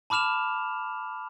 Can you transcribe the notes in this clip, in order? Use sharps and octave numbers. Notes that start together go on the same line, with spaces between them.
A5 B5 D6 F6 E7 F7